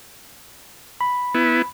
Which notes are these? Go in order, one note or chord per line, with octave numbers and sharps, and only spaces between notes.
B5
B3 E4